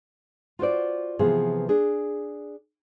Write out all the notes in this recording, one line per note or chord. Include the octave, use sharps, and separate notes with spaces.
F4 F#4 C5 D5
C3 E3 F3 B3 F4 G#4
D4 G#4